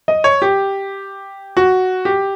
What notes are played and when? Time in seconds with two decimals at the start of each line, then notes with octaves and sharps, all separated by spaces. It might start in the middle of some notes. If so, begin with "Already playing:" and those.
0.08 D#5
0.24 C#5
0.42 G4
1.57 F#4
2.05 G4